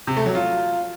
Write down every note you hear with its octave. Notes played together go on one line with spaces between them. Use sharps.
C3
A3
F#3
F4